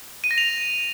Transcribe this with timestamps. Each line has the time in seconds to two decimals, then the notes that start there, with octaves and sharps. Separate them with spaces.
0.24 D#7
0.31 A#6
0.38 F7